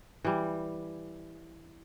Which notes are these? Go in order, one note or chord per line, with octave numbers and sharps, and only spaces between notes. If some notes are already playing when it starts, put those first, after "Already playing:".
E3 G3